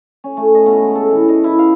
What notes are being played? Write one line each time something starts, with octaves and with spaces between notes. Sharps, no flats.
C#4
A3
D#5
B2
G#3
A4
E3
D#5
E4
F5